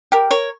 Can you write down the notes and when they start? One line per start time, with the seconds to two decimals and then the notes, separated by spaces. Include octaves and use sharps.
0.12 G4 A#4
0.31 A#4 C#5